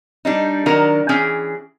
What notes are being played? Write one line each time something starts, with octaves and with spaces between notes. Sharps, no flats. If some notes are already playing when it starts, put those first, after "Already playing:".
G3 D4 D#4
D#3 F#3 D4 A#4
E3 C#4 G#4 G5